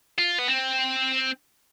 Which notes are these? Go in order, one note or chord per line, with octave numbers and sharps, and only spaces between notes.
F4
B3
C4